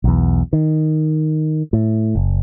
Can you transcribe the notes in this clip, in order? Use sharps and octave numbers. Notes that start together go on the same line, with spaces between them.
B1 E2
D#3
A2
F#1